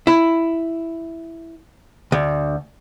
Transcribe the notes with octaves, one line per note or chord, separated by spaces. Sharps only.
E4
D2